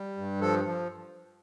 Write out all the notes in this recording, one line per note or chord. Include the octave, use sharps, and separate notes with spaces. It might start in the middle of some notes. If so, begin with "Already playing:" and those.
Already playing: G3
G2
F3 A4
F3